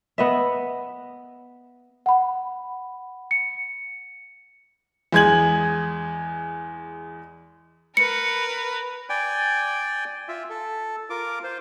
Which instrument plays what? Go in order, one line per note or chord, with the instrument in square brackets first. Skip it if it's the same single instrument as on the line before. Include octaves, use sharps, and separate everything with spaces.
[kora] B3 D#5 E5
[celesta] F#5 B5
C#7
[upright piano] E2 G#3 G#5 G#6 F#7
[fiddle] A#4 B4 [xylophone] C#7
[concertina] D5 G5 G#5
F4 E5
A4
F4 A#4 D6
F4 C5